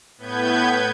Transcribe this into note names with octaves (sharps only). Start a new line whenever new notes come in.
A2 B3 B4 G6 G#6